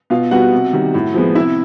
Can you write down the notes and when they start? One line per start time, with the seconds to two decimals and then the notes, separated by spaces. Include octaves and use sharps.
0.10 B2 F4 F5
0.31 G3 B3 F#4 F#5
0.53 C3
0.73 D#3 G3
0.94 A2
1.14 F3 G#3 B3
1.35 C3 E4 E5